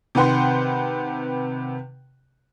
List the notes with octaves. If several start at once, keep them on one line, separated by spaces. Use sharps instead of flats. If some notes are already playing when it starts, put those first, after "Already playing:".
C3 D#3 B4 F#5 G5 C6